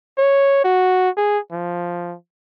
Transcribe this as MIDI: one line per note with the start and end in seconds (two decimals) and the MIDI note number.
0.18 0.62 73
0.64 1.09 66
1.17 1.38 68
1.52 2.16 53